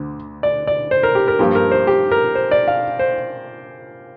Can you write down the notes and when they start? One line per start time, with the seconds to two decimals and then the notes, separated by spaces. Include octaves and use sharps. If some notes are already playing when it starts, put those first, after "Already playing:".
Already playing: D2 D3
0.43 D5
0.67 D5
0.91 C5
1.03 A#4
1.15 G4
1.28 A#4
1.39 G2 F3 A#3 G4
1.55 A#4
1.71 C5
1.87 G4
2.12 A#4
2.35 C5
2.51 D5
2.68 F5
2.99 C5